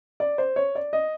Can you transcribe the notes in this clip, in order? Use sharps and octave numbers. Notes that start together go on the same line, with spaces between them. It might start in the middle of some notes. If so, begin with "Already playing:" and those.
D5
C5
C#5
D5
D#5